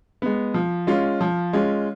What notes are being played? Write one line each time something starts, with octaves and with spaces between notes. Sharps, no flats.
G#3 B3
F3
G#3 C#4 F4
F3
G#3 C#4 F4